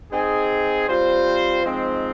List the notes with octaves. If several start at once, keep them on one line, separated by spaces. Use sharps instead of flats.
C4 D#4 G#4
G3 C4 F4 C5
F3 G#3 C4 D#4